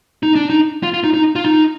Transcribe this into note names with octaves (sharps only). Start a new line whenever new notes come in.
D#4
D4
D#4
F4
F4
D#4
D#4
F4
D#4